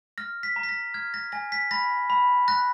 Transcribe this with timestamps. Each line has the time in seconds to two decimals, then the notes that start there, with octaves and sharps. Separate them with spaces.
0.18 F6 A#6
0.43 B6
0.56 A#5
0.63 B6
0.69 A#6
0.94 F6 G#6
1.14 A#6
1.32 G#5 A#6
1.52 B6
1.71 B5 A#6
2.10 B5
2.48 F#6 A#6